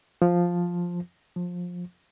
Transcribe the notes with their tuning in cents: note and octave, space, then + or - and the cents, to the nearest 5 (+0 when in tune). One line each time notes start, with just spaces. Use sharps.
F3 +5
F3 +20